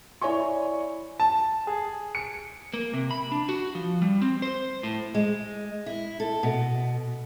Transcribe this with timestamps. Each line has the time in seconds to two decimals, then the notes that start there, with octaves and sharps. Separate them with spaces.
0.21 E4 C#5 D5 G#5 C#6
1.20 A5
1.67 G#4
2.15 C#7
2.74 A#3
2.94 C3
3.11 B5
3.32 D4
3.49 F#4
3.75 F3
4.02 G3
4.22 C4
4.42 C5
4.83 A2
5.14 G#3
5.86 E4
6.20 A4
6.43 B2